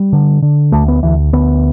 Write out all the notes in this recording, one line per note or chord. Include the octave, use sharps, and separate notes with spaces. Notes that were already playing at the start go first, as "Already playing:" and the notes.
Already playing: G3
D3
D3
D2 A3
B3
D2 E3
D2 B3